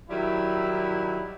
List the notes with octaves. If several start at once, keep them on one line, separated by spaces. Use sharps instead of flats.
D#3 F#3 G3 E4